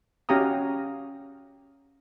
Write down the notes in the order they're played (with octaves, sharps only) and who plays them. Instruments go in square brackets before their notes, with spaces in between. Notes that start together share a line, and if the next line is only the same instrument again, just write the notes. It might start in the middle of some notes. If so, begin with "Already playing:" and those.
[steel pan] C#4 F#4 G4 F5 A#5 D#6